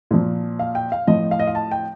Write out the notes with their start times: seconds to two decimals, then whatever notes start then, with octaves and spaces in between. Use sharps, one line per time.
0.11 A#2 F3
0.59 F5
0.75 G5
0.92 F5
1.07 A2 F3 D#5
1.31 F5
1.39 D#5
1.47 F5
1.55 A5
1.71 G5